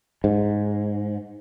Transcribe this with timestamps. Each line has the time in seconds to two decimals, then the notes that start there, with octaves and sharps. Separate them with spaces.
0.24 G#2